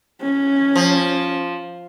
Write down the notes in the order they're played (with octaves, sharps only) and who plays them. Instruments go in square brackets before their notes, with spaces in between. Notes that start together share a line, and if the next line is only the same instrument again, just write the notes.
[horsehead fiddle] C#4
[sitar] F3